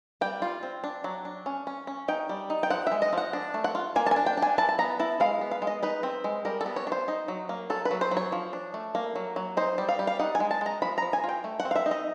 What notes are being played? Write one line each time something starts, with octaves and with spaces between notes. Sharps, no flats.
G3 G5
F4
C4
D4
F#3
D4
C#4
C#4
C#4
D#4 G5
G3
D#4
G5
F3 F#5
G#3 E5
D#5
F3 F#5
D4
A3
F#5
F4
A#3 G#5
A5
G#5
D4
G5
D4
G#5
E4 A5
A5
B3 A#5
E4 A5
G#3 F5
B3
F5
G#3
D#5
D#4 B4
C4
G#3
G3 A#4
A4
B3
C#5
D4
C5
D#4
F#3
A#3
F#3 A4
B4
F#3
C5
F#3
C#5
F3
D4
A3
A#3
F#3
F#3
D#4 C5
G3
F5
G3
F5
D#4 F#5
G#5
G#3
A5
G#3 A#5
F3 B5
F3 A#5
G#5
F4
G5
A3
F#5
C4
F5
E5
D#4
D#5